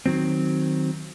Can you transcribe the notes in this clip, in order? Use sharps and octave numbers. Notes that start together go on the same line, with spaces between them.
D#3 F#3 C4